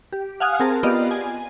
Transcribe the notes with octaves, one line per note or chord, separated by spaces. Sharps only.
G4
F5 F#5 G#5 D#6 F6 F#6
C4 G#4 A#4 A5
B3 F4 G4 D5 D#5 F5
G#5